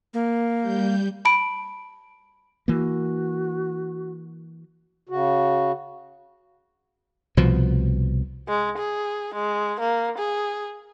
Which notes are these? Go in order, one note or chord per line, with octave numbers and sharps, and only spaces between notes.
A#3
G3 G6
A5 B5 D7
E3 A#3 F#4
C#3 F#4
C2 B2 F3
G#3
G#4
G#3
A#3
G#4